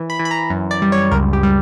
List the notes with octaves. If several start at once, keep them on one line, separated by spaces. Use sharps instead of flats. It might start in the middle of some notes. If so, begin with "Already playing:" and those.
Already playing: E3
B5
E3
B5
A#5
F#2
D5
G3
C#5
C#2 A#4
G4
G3